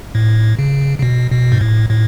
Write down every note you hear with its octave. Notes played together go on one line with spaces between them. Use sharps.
A2
C#3
C#3
B2
B2
G#2
A2
A2